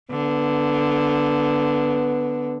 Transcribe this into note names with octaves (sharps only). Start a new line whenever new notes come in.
D3 B3